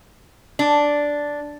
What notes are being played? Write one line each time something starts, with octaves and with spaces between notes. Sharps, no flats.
D4